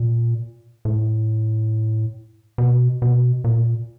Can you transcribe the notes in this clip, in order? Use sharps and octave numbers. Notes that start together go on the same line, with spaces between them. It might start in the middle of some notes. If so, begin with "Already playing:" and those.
Already playing: A#2
A2
B2
B2
A#2